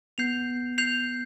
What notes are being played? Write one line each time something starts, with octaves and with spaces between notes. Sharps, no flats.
B3 G6 C7 F7
G6 C7 F7